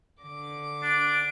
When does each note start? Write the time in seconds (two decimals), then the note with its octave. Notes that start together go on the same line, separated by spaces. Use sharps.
0.21 D3 D6
0.82 D4 D7